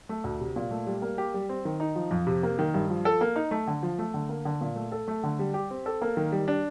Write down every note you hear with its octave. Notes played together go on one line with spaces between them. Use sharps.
A3
D2
C3
A#2
A3
G3
A#3
G4
G3
C4
D#3
D#4
F3
F2
C3
A#3
D#3
G2
F3
A4
A#3
D#4
A3
D3
F3
A3
D3
A#3
D3
A#2
A3
A4
A3
D3
G3
G4
C4
A4
A#3
D#3
G3
D4